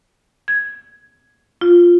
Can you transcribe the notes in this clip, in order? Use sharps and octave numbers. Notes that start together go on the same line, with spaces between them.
G#6
F4